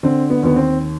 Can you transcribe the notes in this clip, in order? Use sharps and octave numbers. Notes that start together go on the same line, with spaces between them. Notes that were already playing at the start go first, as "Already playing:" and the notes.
D3 C4
B3
D#2 B3
C4